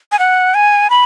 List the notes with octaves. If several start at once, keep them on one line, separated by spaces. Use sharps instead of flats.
G#5
F#5
G#5
B5